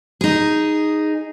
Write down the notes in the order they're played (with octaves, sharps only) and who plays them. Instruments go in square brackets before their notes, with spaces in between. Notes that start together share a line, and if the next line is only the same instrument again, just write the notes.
[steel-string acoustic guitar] D#4 G#4